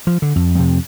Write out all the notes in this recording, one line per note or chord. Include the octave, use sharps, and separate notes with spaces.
F3
D3
F2
F2 C3